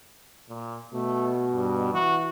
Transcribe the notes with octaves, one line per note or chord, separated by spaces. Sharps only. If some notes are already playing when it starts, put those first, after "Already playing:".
A#2
B2 A3
G2
E3 F#4